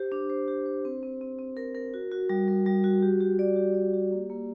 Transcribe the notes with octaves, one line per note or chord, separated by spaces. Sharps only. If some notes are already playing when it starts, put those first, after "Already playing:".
Already playing: G4 C5
D4
C5
G4
C5
C4
C4
C4
C4
A#4
A#4
F#4
F#4
G3
G3
G3
F#4
G4
G4
D5
G4
D5
G4
A#3
A#3